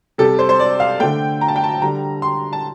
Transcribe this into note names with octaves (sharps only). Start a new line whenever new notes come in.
C3 G3 A4
C5
C5
D5
F5
D3 A3 G5
A#5
A5
G5
A5
D3 G3 A#5
C6
A5